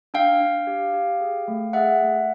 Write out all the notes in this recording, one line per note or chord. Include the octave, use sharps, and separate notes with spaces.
D4 F5 G5
D4
G4
G4
G#4
A3
G#4 E5 F#5
A3